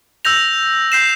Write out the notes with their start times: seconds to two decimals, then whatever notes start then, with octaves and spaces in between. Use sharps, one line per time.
0.25 E6 G6 A#6 F7
0.92 G6 C7 E7